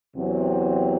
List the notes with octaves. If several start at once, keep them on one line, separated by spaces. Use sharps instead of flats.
E2 C3 F#3 C4